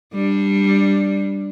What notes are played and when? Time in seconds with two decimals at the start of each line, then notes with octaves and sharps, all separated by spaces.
0.13 G3 D4